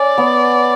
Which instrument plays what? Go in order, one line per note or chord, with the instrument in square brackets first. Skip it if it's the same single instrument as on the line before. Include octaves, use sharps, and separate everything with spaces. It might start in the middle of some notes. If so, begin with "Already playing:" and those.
Already playing: [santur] C#4 [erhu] D5
[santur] B3